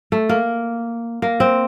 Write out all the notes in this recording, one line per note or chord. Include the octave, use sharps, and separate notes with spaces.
A3
A#3
A#3
C4